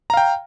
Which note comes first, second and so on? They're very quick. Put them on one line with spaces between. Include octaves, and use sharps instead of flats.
A#5 F5 G5